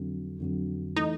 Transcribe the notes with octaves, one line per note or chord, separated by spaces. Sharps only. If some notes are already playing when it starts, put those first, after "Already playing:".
Already playing: F2 D3 F#3
F2 D3 F#3
E3 A3 D#4